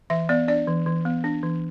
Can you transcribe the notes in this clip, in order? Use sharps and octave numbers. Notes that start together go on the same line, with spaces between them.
E3 E5
B3 D5
D4 D5
E3
E3
B3
D4
E3